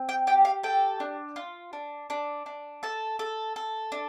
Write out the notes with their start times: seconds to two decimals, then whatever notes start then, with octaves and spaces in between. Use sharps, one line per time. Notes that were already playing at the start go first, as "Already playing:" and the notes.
Already playing: C4
0.09 G5
0.27 G4 G5
0.45 F5
0.63 A4 G5
1.00 D4
1.36 F4
1.73 D4
2.10 D4
2.46 D4
2.83 A4 A5
3.19 A4
3.56 A4
3.92 D4